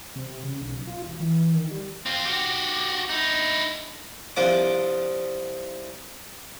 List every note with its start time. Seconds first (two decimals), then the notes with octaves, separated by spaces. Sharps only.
0.16 C3
0.43 C#3
0.61 B1
0.87 F4
1.02 E1
1.20 E3
1.54 D#3
1.71 G3
2.06 C4 F4
2.25 F#4 G4
3.09 D#4 E4
4.36 C2 F3 D4 F#5 D6